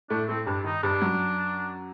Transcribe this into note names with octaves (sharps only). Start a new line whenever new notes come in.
A2 A3 D4
A2 A3 C4
G2 G3 D4
D#3 D#4
G2 G3 D4
F#2 F#3